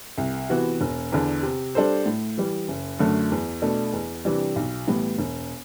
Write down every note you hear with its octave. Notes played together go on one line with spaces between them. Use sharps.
C2
C3 E3 B3 F#4
E1
E2 D3
C3
G3 D4 A4 C5
A2
E3 G3
F#1
F#2 D3 F#3 A3
E2
B2 A3 D4 A4
E2
C3 E3 G3 D4
B1
A2 E3 G3 B3
E1